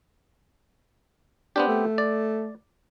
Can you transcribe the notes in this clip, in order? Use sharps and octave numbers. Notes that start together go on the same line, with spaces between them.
B3 C4 D4 G4
A3
D5